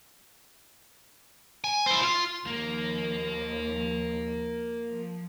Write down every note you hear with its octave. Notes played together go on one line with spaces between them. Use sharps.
G#5
E4 C5
F4
D#2 F3 A#3
F3